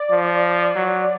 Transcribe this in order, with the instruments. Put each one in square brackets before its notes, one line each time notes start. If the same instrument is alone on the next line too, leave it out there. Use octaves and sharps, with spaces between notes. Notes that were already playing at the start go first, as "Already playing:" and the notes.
Already playing: [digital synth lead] D5
[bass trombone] F3
F#3